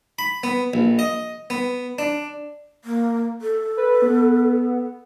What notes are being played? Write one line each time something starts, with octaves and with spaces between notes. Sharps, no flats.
B5
B3
A#1
D#5
B3
D4
A#3
A4
B4
B3